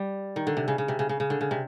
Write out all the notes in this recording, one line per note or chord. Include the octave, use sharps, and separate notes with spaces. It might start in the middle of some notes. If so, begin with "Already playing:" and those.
Already playing: G3
D#3
D3
C3
C#3
C#3
C3
C#3
C#3
C#3
D3
C#3
C3